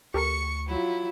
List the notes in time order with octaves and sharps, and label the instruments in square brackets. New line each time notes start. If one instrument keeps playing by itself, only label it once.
[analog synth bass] D2 [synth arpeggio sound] G4 A4 A#4 [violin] C#6 C#7
[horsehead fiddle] F#3 F4 [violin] E4